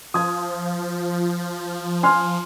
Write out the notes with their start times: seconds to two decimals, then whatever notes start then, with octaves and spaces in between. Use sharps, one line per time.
0.14 F3 D#6 G#6
2.03 G#5 C6 F6